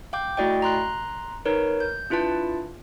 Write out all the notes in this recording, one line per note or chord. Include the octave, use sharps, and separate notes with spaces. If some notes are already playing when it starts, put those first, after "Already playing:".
F5 G5 D6 G6
A3 E4 F#4 D5 D#5 G5
A#5 C6 F#6
D#4 A#4 B4 C#5
G6
D4 E4 F4 B4 A5